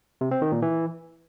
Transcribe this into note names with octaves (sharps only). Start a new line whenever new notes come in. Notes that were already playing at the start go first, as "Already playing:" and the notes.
C3
C4
D#3
A#2
E3